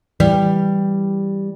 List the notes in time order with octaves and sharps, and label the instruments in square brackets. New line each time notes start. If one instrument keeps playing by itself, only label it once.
[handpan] E3 [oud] G3